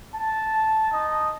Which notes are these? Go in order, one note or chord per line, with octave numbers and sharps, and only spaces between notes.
A5
D#4 D#5 D#6